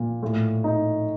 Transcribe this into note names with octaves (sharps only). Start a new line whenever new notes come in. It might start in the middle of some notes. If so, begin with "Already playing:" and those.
Already playing: A#2
A2
D#4